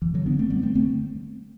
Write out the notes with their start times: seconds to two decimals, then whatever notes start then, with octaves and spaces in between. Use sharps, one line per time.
0.02 F#2 E3
0.14 D3 F#3
0.26 D3 B3 D4
0.39 A3 C4
0.50 F#2 G3 B3
0.62 A3 C4
0.75 D3 A3 C4